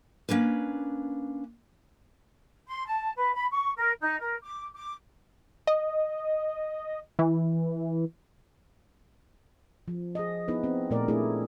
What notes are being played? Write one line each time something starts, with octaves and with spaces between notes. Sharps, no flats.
A#3 C#4 D4 B4
C6
A5
B4
B5
C#6
A#4
D#4
A#4
D6
D6
D#5
E3
F3
G#4 D#5
B3 D#4 E4 G#4 B4
C4
A#2 A3 A#4 D5
A3 C4 D4 E4 G#4